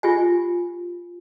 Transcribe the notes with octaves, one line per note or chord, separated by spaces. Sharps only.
F4 G4 G#5